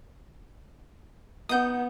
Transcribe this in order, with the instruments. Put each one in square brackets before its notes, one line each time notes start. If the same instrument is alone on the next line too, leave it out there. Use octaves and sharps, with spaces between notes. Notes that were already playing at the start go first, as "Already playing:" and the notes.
[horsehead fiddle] B3 [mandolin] D#4 F#5 G5 [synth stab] D#6 G6